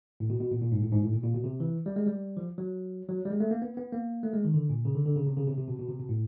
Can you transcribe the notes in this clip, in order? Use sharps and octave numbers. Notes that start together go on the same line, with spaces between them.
A2
B2
B2
A#2
A#2
G#2
A2
G#2
A2
A#2
A#2
B2
C3
E3
G3
G#3
G3
F3
F#3
F#3
G3
G#3
A3
A#3
B3
B3
A#3
A3
G#3
D#3
D3
A#2
C#3
D3
D3
C#3
C3
C#3
C3
C3
B2
B2
C3
B2
A2